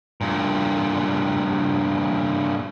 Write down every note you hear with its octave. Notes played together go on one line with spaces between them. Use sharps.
G2 A#2